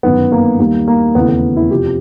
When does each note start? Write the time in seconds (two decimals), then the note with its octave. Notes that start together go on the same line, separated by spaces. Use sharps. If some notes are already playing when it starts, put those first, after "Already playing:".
0.03 G1 F#2 D#3 F#3 B3
0.32 A#3
0.59 D#2 D#3 G3 A#3
0.88 A#3
1.15 E1 D#2 C#3 E3 A3 B3
1.29 B3
1.56 E4
1.70 F2 C3 F3 G4